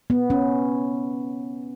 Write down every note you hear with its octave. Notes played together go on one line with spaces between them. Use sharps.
B3
C#4